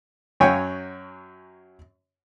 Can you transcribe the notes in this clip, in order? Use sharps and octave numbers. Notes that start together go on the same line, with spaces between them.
F#2 F#3 C#5 G5 G#5